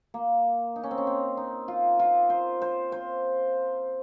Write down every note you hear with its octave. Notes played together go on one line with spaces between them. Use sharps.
A#3
D#4
C#4
C4
C#4
C4
D#4
F4
F4
C5
C5
C5